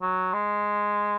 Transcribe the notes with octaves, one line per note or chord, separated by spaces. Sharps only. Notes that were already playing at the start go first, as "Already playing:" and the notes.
F#3
G#3